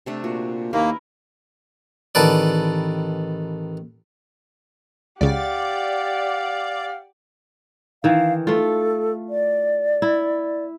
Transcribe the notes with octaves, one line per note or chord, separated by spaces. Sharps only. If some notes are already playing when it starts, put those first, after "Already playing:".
C3 A3 D4
A#2 F#4
D#2 A#3 E4 A#4 B4
A1 D#3 A4 B4 D5
C#2 C#3 G4 D5 F5 F#5
D#3 E3 F5
A3 F4 A4
D5
E4